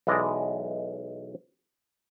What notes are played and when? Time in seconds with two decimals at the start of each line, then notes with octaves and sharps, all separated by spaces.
0.07 B1 E3 G#3 D5 D#5